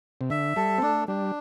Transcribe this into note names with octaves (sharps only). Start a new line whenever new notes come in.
C3
D3 E5
G3 A4
C4
A3 D4
G3 D4